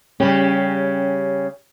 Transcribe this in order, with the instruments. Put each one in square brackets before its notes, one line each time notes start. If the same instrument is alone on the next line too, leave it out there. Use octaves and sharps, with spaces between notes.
[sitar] C#3 G4 [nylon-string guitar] G3 C#4